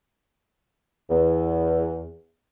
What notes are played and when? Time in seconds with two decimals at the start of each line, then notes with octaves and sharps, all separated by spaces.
1.10 E2